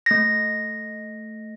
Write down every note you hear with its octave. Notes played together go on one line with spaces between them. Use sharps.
A3 A#6